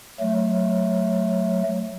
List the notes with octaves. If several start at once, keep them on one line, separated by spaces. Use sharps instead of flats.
F#3 A3